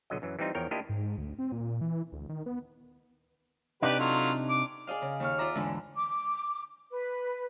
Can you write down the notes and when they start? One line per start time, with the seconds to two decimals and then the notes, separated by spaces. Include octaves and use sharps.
0.10 B1 D3 F#3 D#5
0.22 F#2 E3 F#3
0.39 E3 G3 C4 D#4 F4
0.55 E2 F3 A#4 C#5 G5
0.71 A#3 D4 E4 F4 G4 D#5
0.89 G#2
1.18 D2
1.39 C4
1.52 A#2
1.81 E3
2.12 D2
2.29 D#3
2.46 B3
3.82 C3 D4 D#4 G4 B4 D5
3.99 F#3 A3 F4
4.49 D6
4.87 G#4 D5 D#5 F5
5.02 C#3
5.20 D#2 C#6 F6
5.38 F4 D5 E5 A#5 D6
5.55 E2 G#2 D3 E4
5.95 D6
6.90 B4